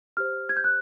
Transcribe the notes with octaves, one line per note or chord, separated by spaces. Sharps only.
G4 C5 F6
G#6
G6
F#6